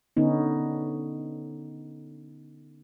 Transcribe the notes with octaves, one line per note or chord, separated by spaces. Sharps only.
D3 B3 C#4 D#4